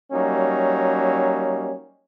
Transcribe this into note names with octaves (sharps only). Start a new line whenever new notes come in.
F#3 G3 A#3 C#4 D#4